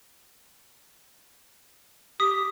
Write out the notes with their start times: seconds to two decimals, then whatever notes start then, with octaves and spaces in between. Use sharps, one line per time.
2.20 G4 D#6 B6